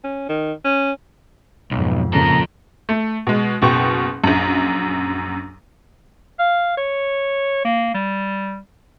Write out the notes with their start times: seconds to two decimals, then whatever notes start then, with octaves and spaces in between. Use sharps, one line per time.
0.04 C#4
0.29 D#3
0.65 C#4
1.71 B1 F2 G#2
2.13 A#2 C#3 F3 A#3 A4 A#5
2.89 A3
3.27 B2 G#3
3.62 F#1 B2 G5 C#6
4.24 A#1 F#2
6.39 F5
6.77 C#5
7.65 A#3
7.94 G3